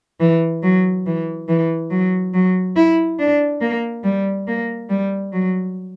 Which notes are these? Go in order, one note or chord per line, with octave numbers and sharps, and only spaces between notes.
E3
F#3
E3
E3
F#3
F#3
E4
D4
A#3
G3
A#3
G3
F#3